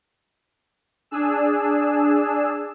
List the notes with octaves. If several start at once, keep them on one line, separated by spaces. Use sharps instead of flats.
D4 G#4 E6